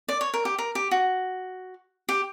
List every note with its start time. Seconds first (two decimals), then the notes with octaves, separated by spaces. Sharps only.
0.09 D5
0.21 C#5
0.34 A#4
0.45 G4
0.58 A#4
0.75 G4
0.91 F#4
2.09 G4